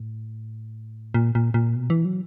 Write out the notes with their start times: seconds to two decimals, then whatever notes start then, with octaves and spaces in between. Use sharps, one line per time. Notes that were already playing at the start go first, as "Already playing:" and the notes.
Already playing: A2
1.14 A#2
1.35 A#2
1.54 A#2
1.76 B2
1.90 E3
2.05 F#3